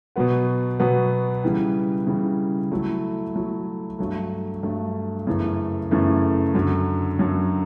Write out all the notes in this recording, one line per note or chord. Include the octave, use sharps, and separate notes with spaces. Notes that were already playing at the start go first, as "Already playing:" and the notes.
B2 F#3 B3 F#4
B2 F#3 B3 F#4
C#3 E3 G3
C#3 E3 G3
F#3 A3 E4
F#3 A3 E4
G2 F#3 A3
G2 F#3 A3
F#2 C#3 E3 A3
F#2 C#3 E3 A3
F#2 D3 F#3
F#2 D3 F#3